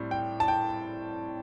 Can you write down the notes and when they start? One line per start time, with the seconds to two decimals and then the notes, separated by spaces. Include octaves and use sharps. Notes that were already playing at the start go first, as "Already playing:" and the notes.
Already playing: A2 G3 C4
0.11 G5
0.40 A5
0.48 G5